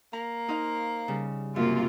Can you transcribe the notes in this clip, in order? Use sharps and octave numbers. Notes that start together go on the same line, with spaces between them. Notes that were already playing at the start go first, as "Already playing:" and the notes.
A#3 A#5
D#4 C5 F5
C#3 G3
F#2 C3 A#3 F4